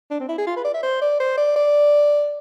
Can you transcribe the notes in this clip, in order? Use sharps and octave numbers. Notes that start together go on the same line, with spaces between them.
D4
C4
E4
G#4
F4
B4
D5
E5
C5
D5
C5
D5
D5